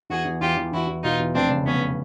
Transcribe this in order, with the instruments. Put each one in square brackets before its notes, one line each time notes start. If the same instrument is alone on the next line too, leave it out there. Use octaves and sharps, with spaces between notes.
[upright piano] E2 [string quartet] F#4 G#4
[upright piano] E2
[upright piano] E2 [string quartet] F4 G4
[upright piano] E2
[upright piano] E2 [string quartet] E4 F#4
[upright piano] E2
[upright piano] B2 [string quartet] D#4 F4
[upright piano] E2
[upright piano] F1 [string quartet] C4 D4
[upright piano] C#3
[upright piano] F1 [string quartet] B3 C#4